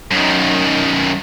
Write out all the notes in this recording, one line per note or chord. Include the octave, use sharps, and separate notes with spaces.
F#2 D#3